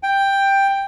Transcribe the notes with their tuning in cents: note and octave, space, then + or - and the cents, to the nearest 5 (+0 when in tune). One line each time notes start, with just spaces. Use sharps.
G5 +5